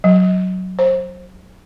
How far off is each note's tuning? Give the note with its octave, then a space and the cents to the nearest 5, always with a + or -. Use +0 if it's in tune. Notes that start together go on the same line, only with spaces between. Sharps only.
F#3 +5
C5 +20